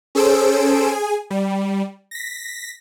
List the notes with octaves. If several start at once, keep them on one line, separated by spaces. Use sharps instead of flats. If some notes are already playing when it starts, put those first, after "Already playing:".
C#4 G#4 A4 C5 E6 D7
G#4 G#5
G3
A#6 B6